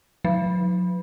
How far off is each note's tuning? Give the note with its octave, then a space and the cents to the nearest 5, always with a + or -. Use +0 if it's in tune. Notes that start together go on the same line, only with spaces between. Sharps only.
F#3 -40